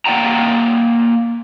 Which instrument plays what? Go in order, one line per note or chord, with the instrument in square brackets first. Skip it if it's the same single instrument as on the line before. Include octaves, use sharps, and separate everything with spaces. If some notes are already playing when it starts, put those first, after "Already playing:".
[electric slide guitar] A#3 D5 F#5 G5 A#5